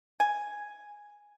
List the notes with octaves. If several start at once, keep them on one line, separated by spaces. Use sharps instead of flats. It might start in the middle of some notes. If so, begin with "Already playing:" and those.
G#5